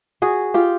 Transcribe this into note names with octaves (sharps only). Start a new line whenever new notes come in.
F#4 G#4
F4 G4